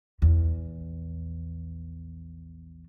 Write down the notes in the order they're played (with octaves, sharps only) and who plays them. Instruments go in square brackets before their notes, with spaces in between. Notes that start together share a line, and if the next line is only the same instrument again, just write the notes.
[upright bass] A#1 E2